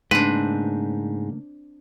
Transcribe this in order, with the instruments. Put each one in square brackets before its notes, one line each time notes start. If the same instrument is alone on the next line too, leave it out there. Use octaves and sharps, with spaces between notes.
[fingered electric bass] G#2 [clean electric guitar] C#3 A3 A#3 [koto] C4 D4 [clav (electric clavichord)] B4